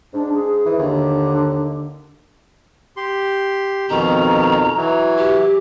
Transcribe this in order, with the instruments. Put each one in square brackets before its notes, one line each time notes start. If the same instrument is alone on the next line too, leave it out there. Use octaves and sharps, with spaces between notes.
[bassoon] G#2 [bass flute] D4
[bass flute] G#4
[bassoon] E3
[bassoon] D#2 [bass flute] D3
[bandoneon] G4 C6
[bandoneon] F2 B2 D#3 [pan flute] A#5
[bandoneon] E3 F#3
[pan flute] G4